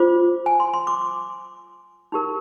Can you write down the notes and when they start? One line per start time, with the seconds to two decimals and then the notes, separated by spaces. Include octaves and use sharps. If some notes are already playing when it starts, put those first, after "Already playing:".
Already playing: F4 C5 D6
0.46 G#5
0.60 C6
0.74 C6
0.87 D6
1.01 D6
2.12 D#4 G4 A#4